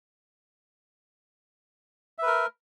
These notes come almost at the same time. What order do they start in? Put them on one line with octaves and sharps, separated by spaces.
E5 B4 A#4